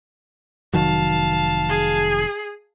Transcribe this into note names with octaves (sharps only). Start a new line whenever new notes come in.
F1 D#3 F#3 F5 A5
G#4